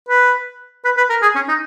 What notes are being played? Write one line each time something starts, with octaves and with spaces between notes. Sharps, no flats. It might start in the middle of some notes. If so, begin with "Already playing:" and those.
B4
B4
B4
A#4
G#4
C#4
D#4